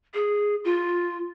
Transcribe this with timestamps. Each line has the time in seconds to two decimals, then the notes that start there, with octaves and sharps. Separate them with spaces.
0.14 G#4
0.64 F4